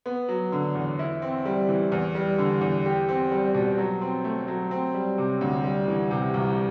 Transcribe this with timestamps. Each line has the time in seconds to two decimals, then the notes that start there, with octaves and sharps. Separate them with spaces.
0.06 B3
0.29 F#3
0.52 D3
0.75 E2
0.99 E4
1.22 C4
1.45 G3
1.69 E3
1.92 E2
2.15 G3
2.39 D3
2.61 E2
2.85 G4
3.09 C4
3.32 G3
3.54 B2
3.78 F#3
4.01 C4
4.24 A3
4.48 F#3
4.71 C4
4.94 G3
5.18 C3
5.41 D2
5.64 G3
5.88 E3
6.11 C3
6.34 C2